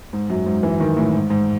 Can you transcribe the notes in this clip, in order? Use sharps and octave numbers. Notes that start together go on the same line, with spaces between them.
G#2
F#2
G#2
E3
D#3
A2
G#2
G#2